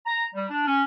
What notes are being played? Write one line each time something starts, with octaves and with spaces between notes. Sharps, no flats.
A#5
G3
D4
C#4